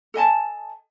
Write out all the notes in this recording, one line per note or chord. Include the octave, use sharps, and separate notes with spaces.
A4 D#5 G#5 A5